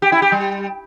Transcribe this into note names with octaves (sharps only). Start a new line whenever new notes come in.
G4
E4
G4
G3